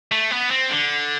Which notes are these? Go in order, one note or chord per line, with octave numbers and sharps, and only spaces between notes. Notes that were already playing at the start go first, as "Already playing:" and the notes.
A3
B3
C4
D3